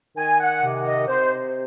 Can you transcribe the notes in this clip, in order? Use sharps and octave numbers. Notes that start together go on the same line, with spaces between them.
D#3 G#5
F#5
C3
D#5
C3 C5